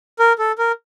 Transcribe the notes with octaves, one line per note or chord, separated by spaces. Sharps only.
A#4
A4
A#4